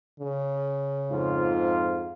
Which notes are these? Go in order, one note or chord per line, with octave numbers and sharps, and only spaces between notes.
C#3
F2 G#2 F4